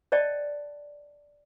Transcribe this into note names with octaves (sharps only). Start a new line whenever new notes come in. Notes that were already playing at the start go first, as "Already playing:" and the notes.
C5 D5 D#5 G5 A5